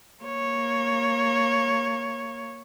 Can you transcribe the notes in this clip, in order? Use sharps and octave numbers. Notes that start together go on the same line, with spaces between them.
A#3 C#5